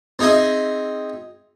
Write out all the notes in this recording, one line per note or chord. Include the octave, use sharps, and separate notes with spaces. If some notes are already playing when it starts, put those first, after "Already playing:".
C4 D#4 G#4 D#5 E5